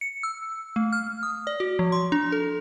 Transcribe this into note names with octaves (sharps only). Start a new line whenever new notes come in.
C#7
E6
A3
F6
D#6
D5
F#4
F3
C6
D4
A4